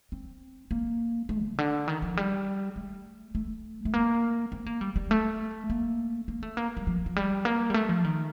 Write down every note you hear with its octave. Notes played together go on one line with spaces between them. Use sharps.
C4
A#3
A3
C3
D3
D#3
F3
G3
A3
A3
A3
A#3
C4
A#3
G3
G3
A3
A#3
A#3
A3
A#3
G3
F3
F3
G3
A#3
G3
A3
F3
D#3